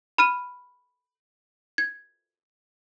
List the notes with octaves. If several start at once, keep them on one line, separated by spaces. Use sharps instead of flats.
B5 F6 D#7
G#6